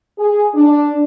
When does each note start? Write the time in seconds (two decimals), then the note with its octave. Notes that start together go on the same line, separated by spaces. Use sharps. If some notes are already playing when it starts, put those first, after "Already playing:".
0.19 G#4
0.54 D4